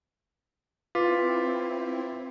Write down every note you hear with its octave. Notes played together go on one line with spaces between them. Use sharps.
C4 E4 F4 B4 D6 B6